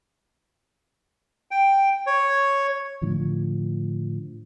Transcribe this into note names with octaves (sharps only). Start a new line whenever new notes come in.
G5
C#5
A2 D3 F3